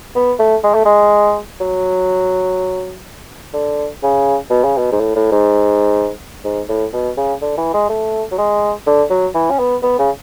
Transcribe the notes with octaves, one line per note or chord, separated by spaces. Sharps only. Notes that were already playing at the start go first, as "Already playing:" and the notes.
B3
A3
G#3
A3
G#3
F#3
D3
C#3
B2
C#3
B2
G#2
A2
A2
G#2
G#2
A2
B2
C#3
D3
E3
G#3
A3
F#3
G#3
D3
F#3
E3
C#4
B3
B3
C#3